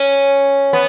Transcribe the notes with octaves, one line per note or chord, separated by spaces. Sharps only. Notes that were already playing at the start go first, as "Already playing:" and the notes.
Already playing: C#4
B3